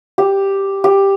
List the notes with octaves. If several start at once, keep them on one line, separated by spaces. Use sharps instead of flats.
G4
G4